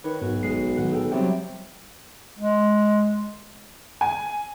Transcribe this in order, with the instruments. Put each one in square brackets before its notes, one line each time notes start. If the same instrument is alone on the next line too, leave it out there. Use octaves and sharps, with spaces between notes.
[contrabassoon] D#3 [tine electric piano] B4 [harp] C#5
[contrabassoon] B1 [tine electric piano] G#2 [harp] F#4
[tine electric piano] G#1 G#4 C7 [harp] G#3
[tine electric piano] A2 D#3 F#3 [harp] F#5
[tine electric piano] G#4 A4 G5
[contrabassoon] C3 [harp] F#3 G3 B3 [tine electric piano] C5 C#5 G5
[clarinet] G#3
[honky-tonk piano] G#5